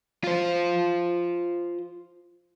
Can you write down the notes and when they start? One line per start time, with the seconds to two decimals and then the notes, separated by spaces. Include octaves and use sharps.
0.24 F4 C5